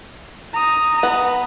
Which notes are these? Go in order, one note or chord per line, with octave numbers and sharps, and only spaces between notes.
A#5 D#6
B3